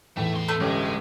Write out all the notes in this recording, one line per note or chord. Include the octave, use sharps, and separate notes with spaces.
E2 A2 A3
B2 C6
A3
G1 G#3 C#4 G4